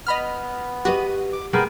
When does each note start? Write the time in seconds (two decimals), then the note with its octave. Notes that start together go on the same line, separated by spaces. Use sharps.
0.07 B3 D#5 B5 F6
0.85 F#4 G4 B4 D#5
1.33 D6
1.53 B2 G#3 B3 G#4 A#4 G5